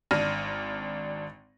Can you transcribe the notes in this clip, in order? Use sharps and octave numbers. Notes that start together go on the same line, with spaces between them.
G#1 D4 F6 A#6 D#7